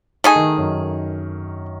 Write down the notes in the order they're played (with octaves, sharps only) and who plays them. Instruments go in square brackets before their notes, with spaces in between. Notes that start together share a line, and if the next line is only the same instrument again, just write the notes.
[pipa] A3 D#4 G#4
[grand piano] D#3
F#2